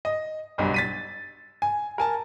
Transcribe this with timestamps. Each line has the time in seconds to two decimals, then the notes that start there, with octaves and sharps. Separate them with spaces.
0.05 D#5
0.58 F#1 B1 G2
0.74 A6 B6 D#7
1.62 G#5
1.98 A#4 G#5 A5